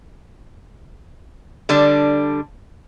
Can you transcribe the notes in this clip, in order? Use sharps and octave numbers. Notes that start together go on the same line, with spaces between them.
D3 G3 D4